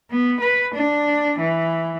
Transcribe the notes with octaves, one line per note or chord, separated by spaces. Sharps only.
B3
B4
D4
E3